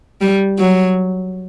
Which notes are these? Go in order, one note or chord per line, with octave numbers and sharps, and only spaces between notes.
G3
F#3